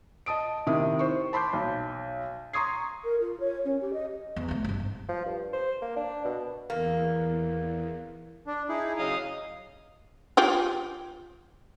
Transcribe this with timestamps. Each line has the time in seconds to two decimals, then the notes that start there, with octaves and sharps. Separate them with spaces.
0.26 D#5 A5 D#6 D7
0.67 C3 D#3 E4 D#6
0.99 C5 C#6
1.33 A5 B5 C6 D6 G6
1.53 B1
2.53 A#5 C6 C#6 D#6 G#6 C7
3.04 A#4
3.21 F4
3.40 C#5
3.65 C#4
3.81 G4
3.93 D#5
4.36 E2
4.48 D2 A3
4.64 G1 C2
4.80 G#2
5.09 F3
5.25 G2
5.53 C5
5.82 A#3
5.96 D4
6.25 B2
6.70 E2 A#3
8.47 D4
8.69 D#4 E4 G#4
8.98 C#3 F#3 D#5 F5
10.37 F4 G4 G#4